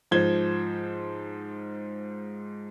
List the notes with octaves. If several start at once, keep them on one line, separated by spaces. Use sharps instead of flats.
G#2 F3 C5 G#6 G7